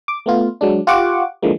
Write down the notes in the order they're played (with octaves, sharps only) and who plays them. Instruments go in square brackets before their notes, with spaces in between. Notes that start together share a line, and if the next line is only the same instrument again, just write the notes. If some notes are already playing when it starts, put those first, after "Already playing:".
[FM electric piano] D6
A3 B3 F4
F#3 G#3 D4
F4 G4 F#5 C#6 D6
D3 E3 F3 G#3 A#3